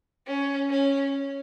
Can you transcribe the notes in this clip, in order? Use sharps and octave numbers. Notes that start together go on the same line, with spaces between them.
C#4
C#4